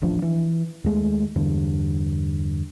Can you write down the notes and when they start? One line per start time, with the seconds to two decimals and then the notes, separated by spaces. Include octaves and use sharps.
0.01 D#1 A1 F3 D4
0.22 E3
0.84 D#2 G#3 A3
1.36 E2 G2 D3